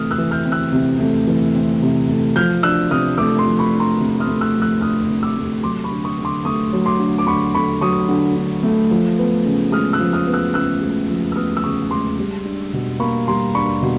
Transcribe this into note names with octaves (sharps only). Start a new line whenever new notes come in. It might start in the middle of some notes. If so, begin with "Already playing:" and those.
Already playing: C3 E3 A3 C4 D#6 F6
E6 F#6
E3
F6 G6
C4
E6 F#6
C3
A3
E3
C4
C3
A3
F3 F6 G6
D4 E6 F#6
C3 D#6 F6
A3 D6 E6
C6 D6
F3
B5 C#6
D4
A#5 C6
C3
D#6 F6
A3
E6 F#6
F3
E6 F#6
D4 D#6 F6
C3
D6 E6
A3
F#3 C6 D6
B5 C#6
D3
C#6 D#6
D3
C6 D6
A3 C#6 D#6
F#3
C6 D6
D3
D6
D3 B5 C#6
A3 B5 C#6
F#3 C#6 D#6
D3
D3
A3
F3
B3
C#3
G#3 D#6 F6
E6 F#6
F3
D#6 F6
B3
E6 F#6
C#3 E6 F#6
G#3
F3
E6
B3 D#6 F6
E6
C#3 C#6 D#6
G#3 C6 D6
G3
D4
B2
A#3 B5 C#6
G3 A#5 C6
D4 B5 C#6
B2